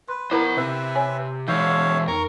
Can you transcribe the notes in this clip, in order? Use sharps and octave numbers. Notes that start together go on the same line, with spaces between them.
B4 C6
B3 E4 A#4 C5 A#5 B5
C3 B4 E5
C#5 G#5
E3 G#3 C#5 E5 F5 G6
F2 A#4 C#6